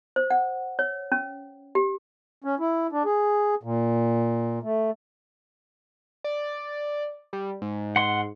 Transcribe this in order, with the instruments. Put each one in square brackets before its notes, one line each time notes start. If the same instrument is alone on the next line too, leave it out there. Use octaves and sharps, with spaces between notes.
[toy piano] C5
F#5
C#5
C#4
G4
[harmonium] C#4
E4
D4
G#4
A#2
A3
[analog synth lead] D5
G3
G#2
[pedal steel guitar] F#5 C6